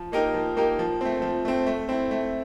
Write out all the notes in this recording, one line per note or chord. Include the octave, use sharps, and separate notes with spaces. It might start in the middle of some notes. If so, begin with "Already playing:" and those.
Already playing: F3
A#3 D#4 G4 A#4
F3
A#3 D#4 G4 A#4
F3
A3 C4
F3
A3 C4
A3
C4 E4
A3